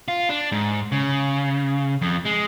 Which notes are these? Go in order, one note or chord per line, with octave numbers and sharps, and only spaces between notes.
F4
D4
G#2
C#3
F2
G#3